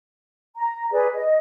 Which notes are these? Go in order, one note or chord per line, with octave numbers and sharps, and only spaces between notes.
A#5
G#4 B4 D5
D#5